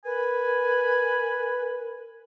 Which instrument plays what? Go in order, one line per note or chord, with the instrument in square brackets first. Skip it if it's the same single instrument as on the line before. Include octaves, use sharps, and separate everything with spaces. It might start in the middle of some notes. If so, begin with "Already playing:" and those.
[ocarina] A#4 [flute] B4 [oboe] G#5